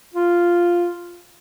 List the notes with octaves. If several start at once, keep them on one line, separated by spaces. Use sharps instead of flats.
F4